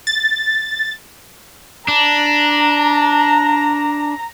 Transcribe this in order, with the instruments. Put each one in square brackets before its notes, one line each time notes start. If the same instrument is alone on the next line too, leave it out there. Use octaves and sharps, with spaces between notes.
[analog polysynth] A6
[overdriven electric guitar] D4 [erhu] A#5